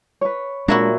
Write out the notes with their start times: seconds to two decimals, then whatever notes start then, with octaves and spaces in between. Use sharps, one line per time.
0.21 B4 C#5
0.68 A#2 F#3 G#3 D4 E4 F#4